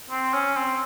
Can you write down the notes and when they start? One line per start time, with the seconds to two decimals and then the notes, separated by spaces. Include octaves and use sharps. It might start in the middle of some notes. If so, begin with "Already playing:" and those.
0.10 C4
0.34 C#4
0.57 C4